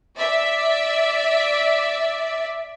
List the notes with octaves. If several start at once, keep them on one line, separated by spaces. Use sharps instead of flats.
D5 E5